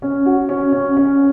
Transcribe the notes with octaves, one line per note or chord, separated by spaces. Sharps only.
C#4
F#4
C#4
C#4
C#4